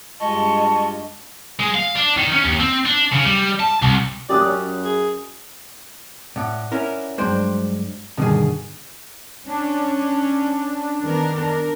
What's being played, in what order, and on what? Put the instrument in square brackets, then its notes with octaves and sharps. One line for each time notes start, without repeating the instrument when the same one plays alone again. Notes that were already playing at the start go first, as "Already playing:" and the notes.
[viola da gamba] G2 G#3 F4 [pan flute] D#5 [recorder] A5 [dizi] C#6
[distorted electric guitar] G#3
F5
D4
D#3
C#4
D#2
C4
D4
C#3
G3
A5
C2
[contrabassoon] F#2 [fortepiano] G4 D#6 F#6 [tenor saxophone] D5
[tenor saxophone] C#4
G#4
[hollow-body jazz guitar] A2 [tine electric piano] D5 F#5
[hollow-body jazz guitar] C#4 E4 A#4
[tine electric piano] G2 F#3 G#3 [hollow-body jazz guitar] D4 C5 G5
[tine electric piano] G2 D3 D#3 [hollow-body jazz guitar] B2 G#4
[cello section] C#4 [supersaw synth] D4
[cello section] D#3 B3 A#4
A#4